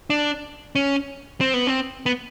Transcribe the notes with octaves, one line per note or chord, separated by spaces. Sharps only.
D4
C#4
C4
B3
C4
B3